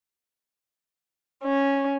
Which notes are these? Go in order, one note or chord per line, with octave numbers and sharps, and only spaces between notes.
C#4